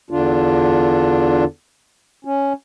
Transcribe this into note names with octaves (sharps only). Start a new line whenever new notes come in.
E2 D3 D4 F4
C#4